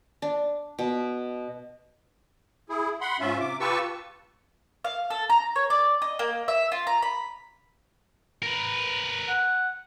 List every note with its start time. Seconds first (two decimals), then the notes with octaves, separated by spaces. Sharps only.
0.22 D4
0.79 B2
2.69 E4 G#4
3.01 F#5 B5 C6
3.20 G#2 C#4 F4 E5
3.40 C3 D6
3.60 F4 G4 B4 A5 C#6 E6
4.84 F5
5.10 A4
5.30 A#5
5.56 C#5
5.70 D5
6.02 D#5
6.19 A#3
6.48 E5
6.72 F4
6.87 A#5
7.03 B5
8.42 A#4 B4
9.29 F#5